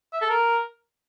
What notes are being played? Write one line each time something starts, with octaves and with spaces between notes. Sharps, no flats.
E5
A4
A#4